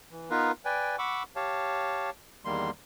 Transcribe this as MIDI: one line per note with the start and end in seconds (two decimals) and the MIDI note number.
0.11 0.29 52
0.31 0.52 59
0.31 0.52 63
0.31 0.52 65
0.31 0.52 70
0.31 0.52 71
0.31 0.52 77
0.65 0.96 71
0.65 0.96 74
0.65 0.96 79
0.65 0.96 80
0.99 1.23 78
0.99 1.23 83
0.99 1.23 85
0.99 1.23 86
0.99 1.23 88
1.36 2.10 67
1.36 2.10 73
1.36 2.10 77
1.36 2.10 81
2.45 2.70 40
2.45 2.70 51
2.45 2.70 55
2.45 2.70 58
2.45 2.70 84